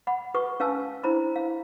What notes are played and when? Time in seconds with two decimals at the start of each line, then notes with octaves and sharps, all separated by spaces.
0.07 F#5 B5
0.34 F#4 B4 C#6 D#6
0.60 C#4 B4 F5 G#5 A5 E6
1.04 D4 E4 C5 A#5 B5
1.36 F5